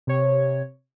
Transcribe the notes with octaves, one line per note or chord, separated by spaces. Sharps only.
C3 C#5